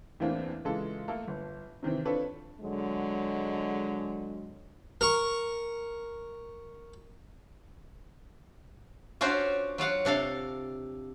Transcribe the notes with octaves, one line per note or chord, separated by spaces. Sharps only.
E2 A2 E3 A#3 C4 D4
C#3 E3 G#3 F4 A4
A3 A#3 A4 A#4
G1
C3 D#3 E3 C4
C4 D4 F4 A4 B4 C#5
D3 F#3 G#3
A#4 C#6
C#4 D4 F4 F#4 C5 D5
F#3 F4 F5 F#5
C3 D4 A4 F5